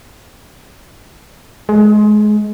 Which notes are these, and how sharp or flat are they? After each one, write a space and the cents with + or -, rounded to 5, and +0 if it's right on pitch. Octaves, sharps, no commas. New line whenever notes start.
G#3 +25